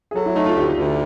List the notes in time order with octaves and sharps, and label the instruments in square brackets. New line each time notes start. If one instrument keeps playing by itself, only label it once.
[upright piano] G#4
[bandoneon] F#3 [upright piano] A4
[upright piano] E4
[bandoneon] A3 [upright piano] D#4
[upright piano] F4
[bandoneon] D2 [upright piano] G4
[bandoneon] D2